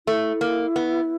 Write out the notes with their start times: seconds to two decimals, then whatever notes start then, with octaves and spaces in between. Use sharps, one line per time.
0.07 A3 E4
0.41 A#3
0.76 B3